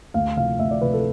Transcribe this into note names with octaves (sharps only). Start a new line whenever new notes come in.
D2 F5
C3 F3 F5
D2 E5
D5
C3 F3 B4
A4